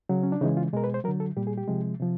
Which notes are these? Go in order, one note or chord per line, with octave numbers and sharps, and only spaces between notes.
C#3 F#3
C#4
D4
C#3 E3 G#3 D#4
F4
B2 G#3 A#4
B4
C5
D3 F#3 A#4
A4
A#2 G3 G4
G#4
G4
C3 F3 G#3
C3 F3